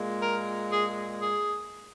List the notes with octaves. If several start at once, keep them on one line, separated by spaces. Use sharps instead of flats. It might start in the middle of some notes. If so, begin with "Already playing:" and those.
Already playing: A#2 G#3
A#4
G#4
G#4